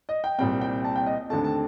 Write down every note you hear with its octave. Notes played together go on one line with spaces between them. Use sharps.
D#5
G5
C2 A#2 G3 C4 G5
G5
A5
G5
D#5
D#2 D3 A3 C4 A5
A5